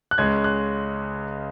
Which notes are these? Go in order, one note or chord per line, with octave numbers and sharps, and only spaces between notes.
F#6
C#2 C#3 G#3 C#4 G#6
F#6